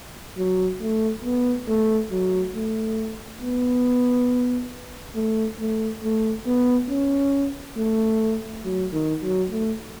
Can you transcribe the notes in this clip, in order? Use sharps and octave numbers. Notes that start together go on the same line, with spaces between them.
F#3
A3
B3
A3
F#3
A3
B3
A3
A3
A3
B3
C#4
A3
F#3
D#3
F#3
A3